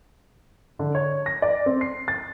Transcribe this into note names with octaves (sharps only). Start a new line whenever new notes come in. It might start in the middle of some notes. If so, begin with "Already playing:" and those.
D3
C#5
A#6
D5
C4
C7
A6